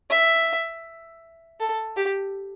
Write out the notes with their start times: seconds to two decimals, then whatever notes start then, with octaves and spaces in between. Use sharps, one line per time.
0.10 E5
1.60 A4
1.97 G4